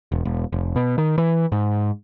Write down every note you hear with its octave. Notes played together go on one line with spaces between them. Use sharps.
E1
E1
F1
B2
D#3
E3
G#2